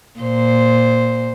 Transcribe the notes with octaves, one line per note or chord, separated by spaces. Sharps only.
A#2 C5